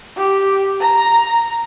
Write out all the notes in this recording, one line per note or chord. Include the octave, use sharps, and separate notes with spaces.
G4
A#5